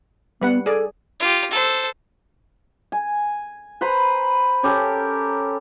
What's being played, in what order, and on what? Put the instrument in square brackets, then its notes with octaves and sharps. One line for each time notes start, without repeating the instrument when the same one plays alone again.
[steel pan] G3 B4 F#5 [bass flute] B3
[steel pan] G#4 D5 [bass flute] A4
[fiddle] F4 G4
A4 C5
[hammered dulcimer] G#5
B4 C5 A#5 B5
C#4 G4 A4 A#4